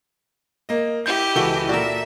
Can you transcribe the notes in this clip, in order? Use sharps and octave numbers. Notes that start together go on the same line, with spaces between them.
A#3 D#5
E4 G4 D#5 G6
C#2 E3 F#4 A4 B4 G7
A#2 F#4 A4 A#4 D5 E5